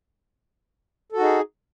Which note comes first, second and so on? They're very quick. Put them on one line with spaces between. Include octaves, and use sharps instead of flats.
A4 F#4 D#4 G#4